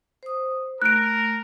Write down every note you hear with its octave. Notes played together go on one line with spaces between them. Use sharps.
C5 D#6
A3 A#4 F#6 D7